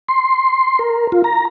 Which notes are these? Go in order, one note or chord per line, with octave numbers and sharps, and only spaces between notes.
C6
A#4
F4
A#5